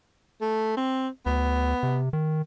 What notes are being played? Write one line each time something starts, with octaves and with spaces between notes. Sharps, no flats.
A3
C4
D2 B3
C3
D#3